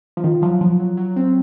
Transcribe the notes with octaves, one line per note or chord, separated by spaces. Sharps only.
F3
D#3 F4
F3 F#3
F3 F#3
F#3
F#3
C4